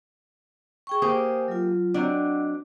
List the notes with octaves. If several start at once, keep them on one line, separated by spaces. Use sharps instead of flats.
G#4 G5 C#6
A#3 G4 G#4 C5 G#5 D#6
F#3 F4
F#3 C4 D4 D#5 F#5